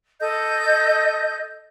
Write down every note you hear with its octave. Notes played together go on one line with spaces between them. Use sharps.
A4 D#5 G6